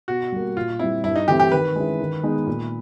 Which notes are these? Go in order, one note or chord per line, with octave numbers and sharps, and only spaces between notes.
B2 F#4
G3 A#3
A#2 F4
G3 C4 E4
G2 E4
D#4
E3 A3 C4 E4 G4
G4
D#3 B4
G#3 C#4 E4
D#3
G#3 B3 D#4
A#2